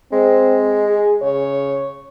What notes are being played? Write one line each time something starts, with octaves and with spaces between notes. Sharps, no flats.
G#3 C4
G#4
C#3 C#5